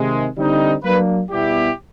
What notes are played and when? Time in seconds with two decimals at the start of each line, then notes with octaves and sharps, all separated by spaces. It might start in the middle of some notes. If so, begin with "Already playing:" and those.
Already playing: C3 D#3 G#3
0.37 D3 G3 C4 D#4
0.84 F#3 A#3 D4 B4
1.31 B2 G3 B3 E4 G4